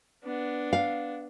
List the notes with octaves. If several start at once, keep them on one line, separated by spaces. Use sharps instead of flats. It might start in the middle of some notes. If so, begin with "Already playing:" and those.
B3 D4
F5